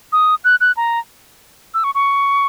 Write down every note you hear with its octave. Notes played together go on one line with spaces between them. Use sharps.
D#6
F#6
F#6
A#5
E6
C#6
C#6